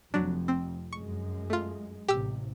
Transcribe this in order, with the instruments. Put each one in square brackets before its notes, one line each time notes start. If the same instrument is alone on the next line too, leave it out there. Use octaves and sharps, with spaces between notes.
[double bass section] F1 F2 [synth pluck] F#3 D4
[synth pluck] C4
[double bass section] F#2 G#3 [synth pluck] C#6
[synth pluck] A3 F4
[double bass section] A1 C3 [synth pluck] G4 E6